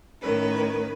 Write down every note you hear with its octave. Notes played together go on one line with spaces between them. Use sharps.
A2 D#3 C#4 B4